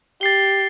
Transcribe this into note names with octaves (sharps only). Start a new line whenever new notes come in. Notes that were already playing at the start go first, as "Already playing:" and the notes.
G4 A6 C7 G7